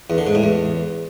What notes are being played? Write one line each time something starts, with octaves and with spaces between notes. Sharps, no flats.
E2
D3
G#2
A2
E2